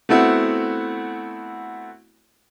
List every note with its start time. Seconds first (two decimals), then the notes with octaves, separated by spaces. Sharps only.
0.09 A3 B3 C4 E4 F#4